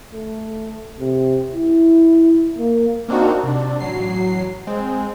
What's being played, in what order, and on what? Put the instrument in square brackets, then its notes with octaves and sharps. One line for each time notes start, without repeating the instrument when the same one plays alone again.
[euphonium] A3
C3
E4
A#3
[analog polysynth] A#3 C4 D4 D#4 F#4
C3 D4
A1 F#3 C7
G#3 C4